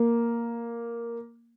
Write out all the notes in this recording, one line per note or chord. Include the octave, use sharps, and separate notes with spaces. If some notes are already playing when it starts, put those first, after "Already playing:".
Already playing: A#3